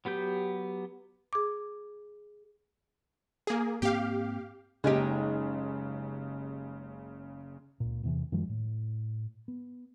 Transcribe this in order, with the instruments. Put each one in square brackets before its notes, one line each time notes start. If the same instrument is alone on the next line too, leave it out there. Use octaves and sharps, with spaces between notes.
[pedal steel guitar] F#3 B3 G4 G6
[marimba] G#4 D6
[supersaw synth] A#3 G#4
[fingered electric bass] G#2 A#3 C4 [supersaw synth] G4 F5
[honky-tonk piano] F#1 C#3 [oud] G#3 D#4 G4
[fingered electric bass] C#2 A#2
E2 C3 E3
F#2 D#3 F3 G#3
A2
B3